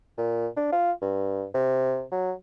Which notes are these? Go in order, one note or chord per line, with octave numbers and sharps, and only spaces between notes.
A#2
D4
F4
G2
C3
F#3